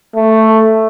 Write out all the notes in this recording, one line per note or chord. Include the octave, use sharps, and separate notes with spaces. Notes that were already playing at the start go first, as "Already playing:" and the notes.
A3